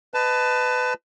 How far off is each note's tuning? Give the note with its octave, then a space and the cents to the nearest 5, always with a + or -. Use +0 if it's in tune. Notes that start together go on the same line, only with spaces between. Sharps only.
B4 +25 D#5 -10 A5 +0